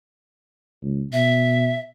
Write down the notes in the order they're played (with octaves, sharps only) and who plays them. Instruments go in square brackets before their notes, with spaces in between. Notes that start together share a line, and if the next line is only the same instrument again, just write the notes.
[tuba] C#2
[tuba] B2 [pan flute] E5